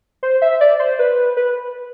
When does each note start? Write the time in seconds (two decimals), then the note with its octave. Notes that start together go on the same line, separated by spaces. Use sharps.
0.23 C5
0.42 E5
0.61 D5
0.80 C5
0.99 B4
1.37 B4